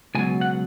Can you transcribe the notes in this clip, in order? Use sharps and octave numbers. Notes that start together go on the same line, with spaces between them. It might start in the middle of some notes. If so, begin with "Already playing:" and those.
C#2 B2 F#3 G#5
F#5